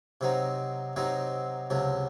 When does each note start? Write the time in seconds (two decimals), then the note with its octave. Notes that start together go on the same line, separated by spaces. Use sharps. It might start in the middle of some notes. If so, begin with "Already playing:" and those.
0.21 C3 F#3 C4 D#4
0.96 C3 F#3 C4 D#4
1.70 C#2 C3 F#3